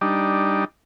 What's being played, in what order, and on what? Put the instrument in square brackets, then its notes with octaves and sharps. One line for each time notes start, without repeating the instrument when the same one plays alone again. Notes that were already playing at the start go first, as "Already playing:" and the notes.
[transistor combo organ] G3 D4 D#4